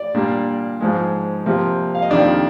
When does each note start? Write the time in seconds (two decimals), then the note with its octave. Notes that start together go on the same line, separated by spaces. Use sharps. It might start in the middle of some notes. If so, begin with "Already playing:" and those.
Already playing: D5
0.15 A#2 G3 A#3 D4
0.80 G#2 F3 G#3
1.46 C3 F3 A#3
1.95 F5
2.02 D#5
2.10 F2 C3 D#3 A#3 D4 D5